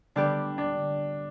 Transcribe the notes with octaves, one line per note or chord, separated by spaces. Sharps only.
D3 G3 B3 D4 G4 D5
D4